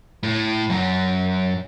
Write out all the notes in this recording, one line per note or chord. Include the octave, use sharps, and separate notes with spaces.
A2
F#2